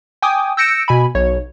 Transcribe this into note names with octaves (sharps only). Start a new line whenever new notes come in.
G5 G#5 D6 D#6
E6 G6 A#6 C#7 D7 E7
B2 G#5 B5
B1 C#5